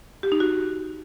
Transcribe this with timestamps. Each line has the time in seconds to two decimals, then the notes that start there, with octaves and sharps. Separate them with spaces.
0.23 G4
0.32 D#4
0.40 F#4